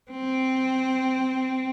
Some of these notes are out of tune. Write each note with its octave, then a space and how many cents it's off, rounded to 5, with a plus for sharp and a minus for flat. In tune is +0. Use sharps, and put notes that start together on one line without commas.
C4 -5